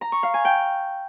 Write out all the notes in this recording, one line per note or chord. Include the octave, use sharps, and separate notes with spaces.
A#5
C#6
F5
G#5
G5